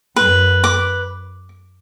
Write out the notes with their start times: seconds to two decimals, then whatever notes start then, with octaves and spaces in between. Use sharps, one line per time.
0.16 F#2 B4
0.64 D6